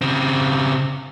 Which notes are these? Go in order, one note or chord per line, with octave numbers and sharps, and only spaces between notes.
C#3 C4